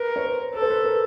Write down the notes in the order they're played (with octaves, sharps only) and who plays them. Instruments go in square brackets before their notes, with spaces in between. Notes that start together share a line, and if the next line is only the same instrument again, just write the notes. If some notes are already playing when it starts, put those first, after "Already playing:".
Already playing: [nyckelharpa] A#4 [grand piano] B4
[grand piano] C#5
C5
[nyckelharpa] A4 [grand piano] B4
[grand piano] C5
B4
A#4